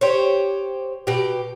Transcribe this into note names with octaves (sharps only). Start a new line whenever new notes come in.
G4 C5 C#5
B2 G4